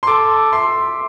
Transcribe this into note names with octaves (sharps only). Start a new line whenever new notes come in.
C6
A4 D6
E5 C6